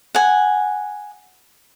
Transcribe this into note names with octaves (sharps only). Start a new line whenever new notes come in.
F#5 G#5